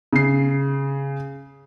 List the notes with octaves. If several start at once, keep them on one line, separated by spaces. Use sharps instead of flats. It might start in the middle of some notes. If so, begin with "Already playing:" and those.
C#3 C7